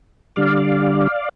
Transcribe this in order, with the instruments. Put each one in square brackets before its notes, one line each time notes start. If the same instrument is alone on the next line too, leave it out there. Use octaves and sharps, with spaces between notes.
[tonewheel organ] D3 G3 D5 F5